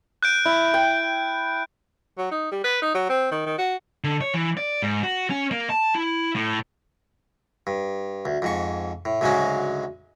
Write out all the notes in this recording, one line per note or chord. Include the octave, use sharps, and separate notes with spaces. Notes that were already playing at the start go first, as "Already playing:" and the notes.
F#6 G6 D7
E4
G5
F#3
D#4
G3
B4
D#4
F#3
C4
D#3
D#3
F#4
D3
C#5
E3
D5
G#2
F#4
C#4
A#3
A5
E4
A2
G2
D2
F2 G#2 C#6
A2
D2 G#2 C#3 F#3 G#3 C#4